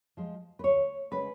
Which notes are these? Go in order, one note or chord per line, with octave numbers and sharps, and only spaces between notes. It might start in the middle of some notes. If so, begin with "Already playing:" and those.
F3 G#3
B4
D2 C#5
C#3 G#3 C#4 B4